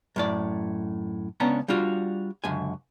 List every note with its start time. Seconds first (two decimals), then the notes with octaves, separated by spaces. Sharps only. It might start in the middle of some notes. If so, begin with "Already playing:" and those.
0.16 F#2 A2 D5
1.40 C#2 B3 C#4 D4 F#5 A#5
1.68 G3 D4 F4 F#4
2.44 C#2 F#2 D3 G#5